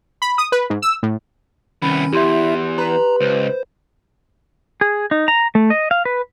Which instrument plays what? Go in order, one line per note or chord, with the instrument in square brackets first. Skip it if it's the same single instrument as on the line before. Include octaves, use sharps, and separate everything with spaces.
[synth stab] B5
D#6
B4
G#2
E6
A2
[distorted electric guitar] C2 B3 [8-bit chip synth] D#3 C#4 [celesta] B5
[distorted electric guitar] E2 [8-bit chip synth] E4 E5 [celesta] G4 C6
[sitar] B4 [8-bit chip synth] A#5
[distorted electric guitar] C#2 [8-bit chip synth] C5
[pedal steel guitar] G#4
D#4
A#5
A3
D#5
F5
B4